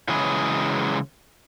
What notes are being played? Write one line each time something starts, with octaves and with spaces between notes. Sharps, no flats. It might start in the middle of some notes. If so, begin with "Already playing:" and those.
C#3 E3 F#3 G#3 G#4 B4